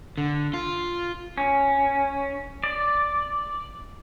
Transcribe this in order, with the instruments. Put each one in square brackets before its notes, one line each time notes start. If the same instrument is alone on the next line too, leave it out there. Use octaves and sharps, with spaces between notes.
[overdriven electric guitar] D3
F4
[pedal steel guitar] C#4
D5